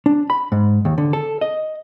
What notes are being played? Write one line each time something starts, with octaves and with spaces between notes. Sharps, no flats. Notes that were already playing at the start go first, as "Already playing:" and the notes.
D4
B5
G#2
D#2
D3
A4
D#5